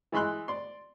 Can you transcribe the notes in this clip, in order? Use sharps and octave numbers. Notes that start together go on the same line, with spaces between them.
E3 G#3 B5 C6 F#6
D5 C6